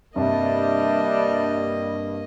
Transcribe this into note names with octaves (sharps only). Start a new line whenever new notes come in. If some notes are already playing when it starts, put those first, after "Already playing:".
G2 C3 G3 A#3 D4 D#5 E5 A5